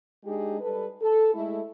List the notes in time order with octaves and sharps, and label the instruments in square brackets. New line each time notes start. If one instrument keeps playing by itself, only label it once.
[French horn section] G#3 D4 D#4 G4 G#4
G3 A4 B4
A4
G#3 A3 E4